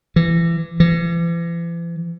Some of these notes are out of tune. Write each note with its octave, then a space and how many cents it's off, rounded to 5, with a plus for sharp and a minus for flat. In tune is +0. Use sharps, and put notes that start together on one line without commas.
E3 +25
E3 +40